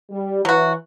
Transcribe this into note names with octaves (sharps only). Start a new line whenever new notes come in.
G3
E3 F#3 F#4